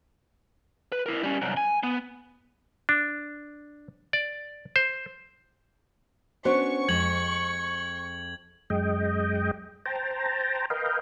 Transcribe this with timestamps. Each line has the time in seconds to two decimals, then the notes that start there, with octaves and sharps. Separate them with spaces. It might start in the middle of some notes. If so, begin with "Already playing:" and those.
0.92 B4
1.06 E4 A#4
1.23 G3 C#4
1.42 C2 F#2
1.57 G#5
1.83 B3
2.89 D4
4.13 D5
4.76 C5
6.45 B3 C#4 D4 F#4 C5 C#6
6.88 F2 G#3 G#6 F#7
8.70 F#2 G#3 D#5 G5
9.86 C5 G5 A5 A#5
10.70 A#4 B4 D#5 F5 G5